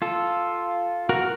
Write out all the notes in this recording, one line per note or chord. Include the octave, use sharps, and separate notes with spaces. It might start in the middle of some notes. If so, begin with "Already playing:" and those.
F4 A4
F#4 A#4